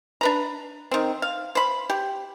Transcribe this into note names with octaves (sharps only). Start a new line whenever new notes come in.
D4 B4 A#5
D#3 C4
F5
C5 B5
G4